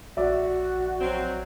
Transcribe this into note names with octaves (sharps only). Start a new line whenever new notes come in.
A#1 F#4 D5 E5
F#3 C4